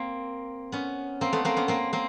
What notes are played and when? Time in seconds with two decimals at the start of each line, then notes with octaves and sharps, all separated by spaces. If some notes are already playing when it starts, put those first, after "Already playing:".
Already playing: A#3 C4
0.72 B3 C#4
1.21 A#3 C4
1.33 A3 B3
1.45 A#3 C4
1.56 B3 C#4
1.68 A#3 C4
1.93 A#3 C4